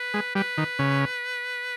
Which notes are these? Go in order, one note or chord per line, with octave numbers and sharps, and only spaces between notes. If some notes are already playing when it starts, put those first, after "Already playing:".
Already playing: B4
G#3
G3 B4
D#3
C#3